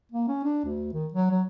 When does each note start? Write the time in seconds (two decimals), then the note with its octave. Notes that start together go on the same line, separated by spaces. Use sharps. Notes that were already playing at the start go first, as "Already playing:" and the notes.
0.12 A#3
0.28 C#4
0.44 D4
0.65 D2
0.93 D#3
1.14 F#3
1.31 F#3